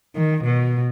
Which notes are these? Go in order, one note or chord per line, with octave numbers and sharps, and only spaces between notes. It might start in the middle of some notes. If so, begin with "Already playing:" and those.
D#3
B2